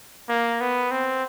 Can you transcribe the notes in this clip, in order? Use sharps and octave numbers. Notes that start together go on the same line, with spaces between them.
A#3
B3
C4